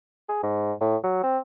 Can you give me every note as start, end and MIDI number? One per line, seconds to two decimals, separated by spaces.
0.29 0.43 68
0.44 0.73 44
0.81 0.97 45
1.04 1.22 54
1.24 1.39 60